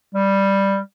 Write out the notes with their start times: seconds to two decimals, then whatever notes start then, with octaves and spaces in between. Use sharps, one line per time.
0.15 G3